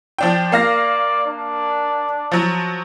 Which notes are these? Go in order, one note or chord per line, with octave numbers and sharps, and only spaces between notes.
F3 D4 G5
A#3 D5 F5 A#6
D4
F3 F#3